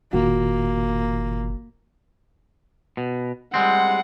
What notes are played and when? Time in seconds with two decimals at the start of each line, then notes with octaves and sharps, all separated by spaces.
0.13 F#1 A#2 D#3 A#3 F4 F#4
2.97 B2
3.54 G3 G#3 C4 F#5